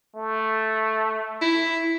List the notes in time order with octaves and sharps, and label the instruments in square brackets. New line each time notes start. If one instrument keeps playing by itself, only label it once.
[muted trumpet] A3
[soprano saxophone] E4